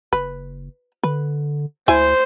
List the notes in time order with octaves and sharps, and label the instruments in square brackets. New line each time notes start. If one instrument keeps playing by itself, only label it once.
[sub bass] F#1 [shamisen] B4
[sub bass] D3 [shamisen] B4
[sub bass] D2 [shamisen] E4 G#5 [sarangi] C5